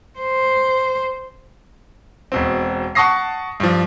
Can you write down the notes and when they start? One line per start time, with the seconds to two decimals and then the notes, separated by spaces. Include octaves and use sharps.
0.20 C5
2.32 E1 B2 C4
2.95 F#5 A5 C#6 D#6 A#6 C7
3.60 G2 F3